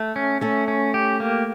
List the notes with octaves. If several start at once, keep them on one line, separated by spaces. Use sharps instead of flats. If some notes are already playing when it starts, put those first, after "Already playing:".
Already playing: A3
C#4
A3 C#4 A4
C#4
G4
A#3